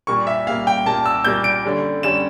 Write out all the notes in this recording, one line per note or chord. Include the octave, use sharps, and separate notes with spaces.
A#2 G3 A#3 C#6
E5
A#2 G3 A#3 F5
G5
A#2 G3 A#3 A5
E6
A#2 G3 A#3 G6
D7
D3 G3 C#4
D3 G3 C#4 E7